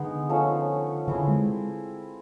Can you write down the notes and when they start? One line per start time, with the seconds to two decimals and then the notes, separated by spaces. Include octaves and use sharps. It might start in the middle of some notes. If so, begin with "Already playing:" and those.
Already playing: D3 G#3 B3 D#4 G#4
0.29 F3 A3 C#4
1.08 D3 C4 E4 G#4
1.28 G#3